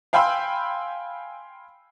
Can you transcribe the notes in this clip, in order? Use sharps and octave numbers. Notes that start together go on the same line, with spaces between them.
F5 G5 G#5 B5 C6 E6